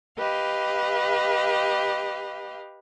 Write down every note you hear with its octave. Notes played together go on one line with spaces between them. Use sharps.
G4 B4 D#5 F5